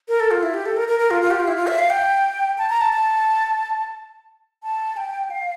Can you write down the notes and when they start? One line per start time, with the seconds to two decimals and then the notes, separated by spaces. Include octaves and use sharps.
0.08 A#4
0.20 A4
0.31 F4
0.43 E4
0.54 G4
0.66 A4
0.77 A#4
0.88 A#4
0.99 A#4
1.11 F4
1.22 F4
1.31 G4
1.40 F4
1.48 E4
1.56 F4
1.67 E5
1.79 F5
1.90 G5
2.58 A5
2.70 A#5
2.81 A5
2.92 A5
4.63 A5
4.97 G5
5.31 F5